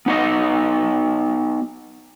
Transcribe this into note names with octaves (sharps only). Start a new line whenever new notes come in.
B3 D#4 F#4 D#5